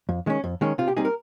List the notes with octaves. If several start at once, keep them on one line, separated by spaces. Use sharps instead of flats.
F2
D#3 G#3 C#4
F2
D#3 G#3 C#4
C3 F4
G4
G3 C4 D#4 G#4
A#4